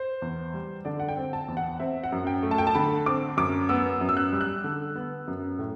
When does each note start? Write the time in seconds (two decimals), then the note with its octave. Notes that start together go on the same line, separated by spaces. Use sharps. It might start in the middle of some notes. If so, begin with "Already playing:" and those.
Already playing: C5
0.22 E2
0.54 G3
0.85 D3 D5
1.00 F#5
1.08 G5
1.17 C4
1.33 A5
1.48 E2
1.57 F#5
1.79 C4 E5
2.04 F#5
2.12 F#2
2.27 G5
2.43 A3
2.51 A5
2.58 G5
2.67 A5
2.75 D3 B5
3.06 C4 D6
3.37 F#2 D6
3.69 B3 E6
4.01 F#2
4.09 E6
4.17 F#6
4.33 G3
4.41 F#6
4.64 D3
4.96 B3
5.28 F#2
5.59 A2